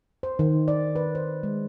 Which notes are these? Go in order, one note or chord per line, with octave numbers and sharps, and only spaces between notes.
C5
D#3
D5
B4
C5
G#3